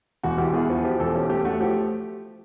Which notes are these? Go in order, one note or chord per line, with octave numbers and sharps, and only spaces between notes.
E1 F#4
E2 G4
E2 F#4 G#4
F3 F#4
F3 G4
E1 G4 A4
C#4 G4
A3 G4
A3 F#4
F3 G4